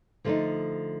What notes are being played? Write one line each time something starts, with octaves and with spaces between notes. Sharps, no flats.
D3 F3 A3 C4 D#4